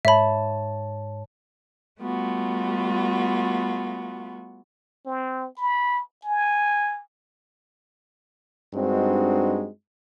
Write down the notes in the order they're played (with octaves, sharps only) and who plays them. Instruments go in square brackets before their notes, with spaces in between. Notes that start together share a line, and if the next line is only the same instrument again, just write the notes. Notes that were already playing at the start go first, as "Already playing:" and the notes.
[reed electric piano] G#2 C#5 A5 [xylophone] E5 B5
[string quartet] G3 A3 B3 F4 F#4
[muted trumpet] C4
B5
G#5
[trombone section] G2 G#3 C4 D4 D#4 F#4